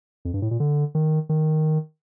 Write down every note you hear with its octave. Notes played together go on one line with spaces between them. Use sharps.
F2
G2
A2
A#2
D3
D#3
D#3